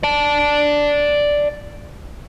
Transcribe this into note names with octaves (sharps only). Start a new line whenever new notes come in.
D5 A5